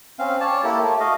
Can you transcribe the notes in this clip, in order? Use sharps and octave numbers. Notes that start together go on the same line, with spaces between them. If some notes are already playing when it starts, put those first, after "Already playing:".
C4 C#4 F5
C#5 D5 A5
A#3 E4 G4 A4
A3
F#4 D#5 F5